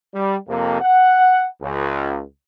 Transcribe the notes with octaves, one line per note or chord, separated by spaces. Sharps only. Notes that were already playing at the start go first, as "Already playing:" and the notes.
G3
F2 C3 A#3
F#5
C#2